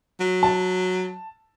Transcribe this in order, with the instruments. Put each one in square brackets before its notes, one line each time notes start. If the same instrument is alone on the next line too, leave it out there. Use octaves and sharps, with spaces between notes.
[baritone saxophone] F#3
[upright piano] A5